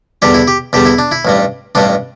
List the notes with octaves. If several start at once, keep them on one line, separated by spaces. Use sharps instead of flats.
E2 D3 G3 G4
E4
G4
E2 D3 G3 G4
E4
D4
E4
A1 G2 G3
A1 G2 G3 D4